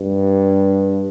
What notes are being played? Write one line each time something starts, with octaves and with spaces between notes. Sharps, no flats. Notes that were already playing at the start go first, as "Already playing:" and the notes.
Already playing: G2